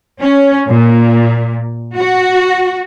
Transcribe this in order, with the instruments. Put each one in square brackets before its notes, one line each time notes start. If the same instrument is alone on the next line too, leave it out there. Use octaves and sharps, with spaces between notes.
[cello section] C#4
A#2
F#4